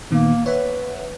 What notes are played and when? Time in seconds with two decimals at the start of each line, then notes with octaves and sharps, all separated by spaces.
0.11 A#2 D#3 A#3 B3
0.46 B4 C#5 E5 F#5